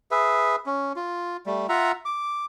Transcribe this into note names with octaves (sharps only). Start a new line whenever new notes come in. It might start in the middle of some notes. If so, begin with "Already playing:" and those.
G#4 B4 E5
C#4
F4
G3 A3
F4 E5 F#5 A#5
D6